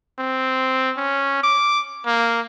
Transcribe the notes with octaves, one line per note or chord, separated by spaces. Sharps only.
C4
C#4
D6
A#3